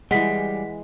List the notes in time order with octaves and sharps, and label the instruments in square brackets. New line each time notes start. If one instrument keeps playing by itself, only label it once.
[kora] E3 G#3 [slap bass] G3 [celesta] F#5 B6